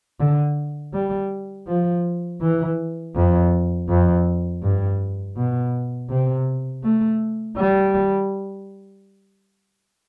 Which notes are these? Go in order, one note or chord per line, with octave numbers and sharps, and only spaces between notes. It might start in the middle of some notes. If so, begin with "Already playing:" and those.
D3
G3
F3
E3
F2
F2
G2
B2
C3
A3
G3